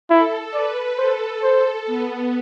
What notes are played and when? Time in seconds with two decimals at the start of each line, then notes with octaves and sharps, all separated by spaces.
0.10 E4 A4
0.54 B4 D5
0.98 A4 C5
1.42 A4 C5
1.87 B3